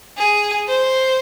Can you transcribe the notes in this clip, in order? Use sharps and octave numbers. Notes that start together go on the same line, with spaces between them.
G#4
C5